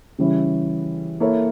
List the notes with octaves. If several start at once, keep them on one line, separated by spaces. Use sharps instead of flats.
C#3 E3 G3 C#4 E4
A#3 E4 A4 C#5